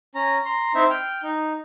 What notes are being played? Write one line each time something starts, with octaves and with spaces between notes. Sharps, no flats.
C#4 A#5
A#5 C6
C4 D#4 E4 C5 E5
G5 F6
D#4